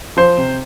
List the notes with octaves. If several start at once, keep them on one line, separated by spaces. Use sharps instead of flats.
F3 C5
C3